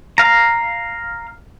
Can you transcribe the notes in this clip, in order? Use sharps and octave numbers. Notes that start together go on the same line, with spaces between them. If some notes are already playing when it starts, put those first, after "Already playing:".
F5 A#5